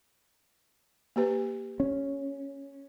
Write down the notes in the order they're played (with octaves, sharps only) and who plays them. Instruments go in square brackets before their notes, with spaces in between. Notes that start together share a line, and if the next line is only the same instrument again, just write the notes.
[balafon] A#3 G4 B4
[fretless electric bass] C#4